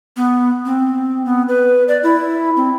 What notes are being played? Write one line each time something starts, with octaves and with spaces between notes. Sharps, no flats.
B3
C4
B3
B4
D5
E4
C4